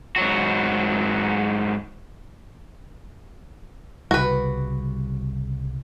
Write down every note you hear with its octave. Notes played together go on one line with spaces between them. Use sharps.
G#2 F#3 F#4
C2 C#3 G3 F#4 B4